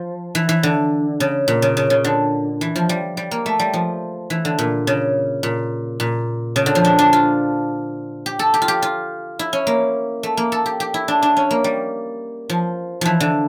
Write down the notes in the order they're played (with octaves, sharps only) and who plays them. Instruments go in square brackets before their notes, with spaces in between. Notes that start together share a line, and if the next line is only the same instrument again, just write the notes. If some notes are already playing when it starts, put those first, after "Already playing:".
Already playing: [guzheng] F3
E3
E3
D3
C#3
A#2
C#3
C#3
C#3
D3
E3
F3
G3
G3
A#3
A3
G3
F3
E3
D3
A#2
C#3
A#2
A#2
C#3
D3
F3
D4
D4
F4
G4
A4
G4
F4
G4
F4
E4
C#4
A#3
A3
A#3
A4
G4
G4
E4
D4
D4
C#4
A#3
G3
F3
E3 F3
D3